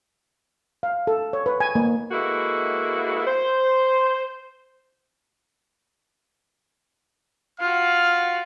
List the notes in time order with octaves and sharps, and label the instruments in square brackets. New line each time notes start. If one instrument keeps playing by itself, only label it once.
[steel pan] F5
A4
C#5
B4
G#5
A#3
[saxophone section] G#3 A#3 B3 E4 F#4 A4
C5
[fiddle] F4 F#4 [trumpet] F5 [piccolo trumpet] F6